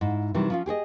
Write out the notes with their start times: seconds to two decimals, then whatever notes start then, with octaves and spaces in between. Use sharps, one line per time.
0.01 G#2 E4
0.34 C3 D#3 E3 F#3 G3
0.50 F3 C#4 F4
0.66 G4 G#4 C#5 D#5